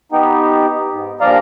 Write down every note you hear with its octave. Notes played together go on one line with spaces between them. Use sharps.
B3 D#4 G4
G#2
G2 A#2 F3 D5 F5 A#5